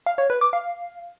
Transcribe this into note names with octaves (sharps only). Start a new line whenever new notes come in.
F5
C#5
B4
D6
F5